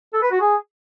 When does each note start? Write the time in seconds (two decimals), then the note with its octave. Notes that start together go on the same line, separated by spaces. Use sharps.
0.13 A4
0.23 B4
0.32 F#4
0.41 G#4